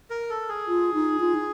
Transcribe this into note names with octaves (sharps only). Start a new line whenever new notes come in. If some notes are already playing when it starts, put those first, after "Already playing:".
A#4
A4
G#4
F4
D#4
F4
D#4